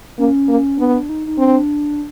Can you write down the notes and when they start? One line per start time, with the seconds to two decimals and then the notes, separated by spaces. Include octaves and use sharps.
0.19 A#3 C#4
0.48 A#3
0.78 B3 D4
1.09 D#4
1.27 D#4
1.38 C4 D4